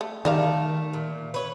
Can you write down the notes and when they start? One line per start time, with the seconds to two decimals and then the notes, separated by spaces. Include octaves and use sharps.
0.01 A3
0.25 D#3 G3 A3 A#4 F5
0.93 A#2
1.34 B4 C#5